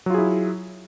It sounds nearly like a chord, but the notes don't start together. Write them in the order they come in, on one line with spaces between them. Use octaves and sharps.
F#3 F4 G#4 E4